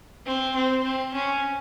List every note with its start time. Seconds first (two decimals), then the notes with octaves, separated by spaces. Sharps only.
0.26 C4
0.56 C4
0.84 C4
1.14 C#4